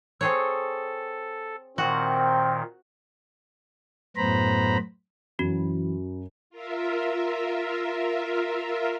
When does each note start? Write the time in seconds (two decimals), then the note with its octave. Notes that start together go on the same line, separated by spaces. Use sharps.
0.21 C4 G#4 A4 C#5
1.78 A#2 D#3 C4 F#4
4.16 F#2 A2 B3 C5 A#5 B5
5.39 F#2 E3 F#4
6.50 F4 A#4 E5